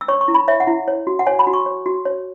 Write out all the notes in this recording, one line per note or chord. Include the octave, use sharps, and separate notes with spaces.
E6
C#5 C#6
C#6
E4
B5
C#5 E5
F#5
E4
C#5
F#4
F#5
C#5 G#5
B5
F#4
C#6
C#5
F#4
C#5